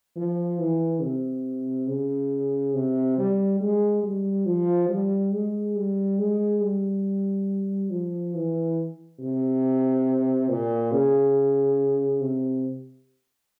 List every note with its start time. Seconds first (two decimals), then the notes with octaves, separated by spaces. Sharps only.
0.16 F3
0.59 E3
1.01 C3
1.87 C#3
2.74 C3
3.18 G3
3.61 G#3
4.04 G3
4.46 F3
4.89 G3
5.33 G#3
5.76 G3
6.19 G#3
6.61 G3
7.90 F3
8.35 E3
9.20 C3
10.49 A#2
10.92 C#3
12.21 C3